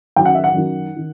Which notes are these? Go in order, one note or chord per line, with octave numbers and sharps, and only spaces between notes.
F#2 D#3 G5
F#5
E5
F#5
F#2 D#3
D#3